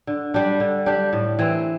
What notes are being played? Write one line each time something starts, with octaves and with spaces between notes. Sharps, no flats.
D3
G3 D4 G4
D3
G3 D4 G4
A2
E3 C4